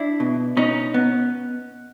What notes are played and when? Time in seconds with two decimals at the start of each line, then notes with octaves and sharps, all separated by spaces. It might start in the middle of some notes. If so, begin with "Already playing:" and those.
Already playing: D4 E4
0.20 B2
0.57 B2 C#4 D#4
0.94 B3